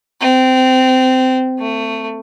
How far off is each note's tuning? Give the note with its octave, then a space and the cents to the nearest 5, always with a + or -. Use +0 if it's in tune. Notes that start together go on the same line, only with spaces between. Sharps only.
C4 -20
A3 +20